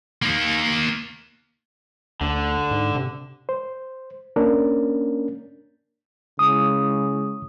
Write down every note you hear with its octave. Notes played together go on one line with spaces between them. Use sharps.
A#3 D#4
D2 D3
G#2
C3
C5
A#3 C#4 D4 A#4
C#3 G#3 E4 C#6 D#6